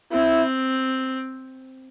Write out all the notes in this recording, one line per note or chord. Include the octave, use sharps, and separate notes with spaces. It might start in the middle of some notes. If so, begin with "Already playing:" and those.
C4 E4